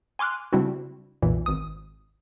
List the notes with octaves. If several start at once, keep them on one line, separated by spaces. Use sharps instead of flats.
G#5 C6 D6 F6 F#6
C#3 G3 C4 D4 E4 F#4
B1 F2 A#2 E3
G#1 D#6